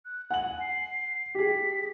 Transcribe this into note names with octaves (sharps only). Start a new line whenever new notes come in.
F#6
F#5 G#5 F#7
C7
G4 G#4 B6